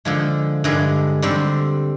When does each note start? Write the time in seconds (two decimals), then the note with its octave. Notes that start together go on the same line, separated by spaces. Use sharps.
0.05 D3 F3 G#3
0.64 G2 D3 G#3
1.22 D3 G3 C4